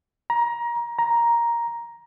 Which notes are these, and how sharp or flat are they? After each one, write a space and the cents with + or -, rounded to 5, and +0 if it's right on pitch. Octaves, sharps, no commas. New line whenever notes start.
A#5 +20
A#5 +5